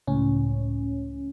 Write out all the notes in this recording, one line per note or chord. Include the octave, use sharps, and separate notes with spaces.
C#2 A2 C#4